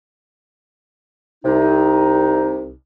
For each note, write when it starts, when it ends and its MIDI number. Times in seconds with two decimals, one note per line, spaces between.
1.45 2.72 36
1.45 2.72 48
1.45 2.72 63